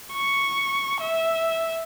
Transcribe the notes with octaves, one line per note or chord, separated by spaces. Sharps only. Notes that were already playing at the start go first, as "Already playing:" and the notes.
C#6
E5